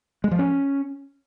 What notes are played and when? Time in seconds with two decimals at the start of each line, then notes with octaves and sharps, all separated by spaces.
0.24 G#3
0.31 F3
0.39 C#4